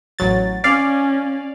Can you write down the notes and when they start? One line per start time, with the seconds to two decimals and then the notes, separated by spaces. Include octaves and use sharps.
0.19 A1 F#3 A6
0.64 C#4 D5 F5